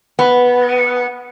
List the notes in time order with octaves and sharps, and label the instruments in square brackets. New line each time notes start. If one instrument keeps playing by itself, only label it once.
[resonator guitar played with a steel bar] B3